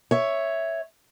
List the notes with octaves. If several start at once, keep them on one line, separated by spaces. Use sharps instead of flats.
C#5 E5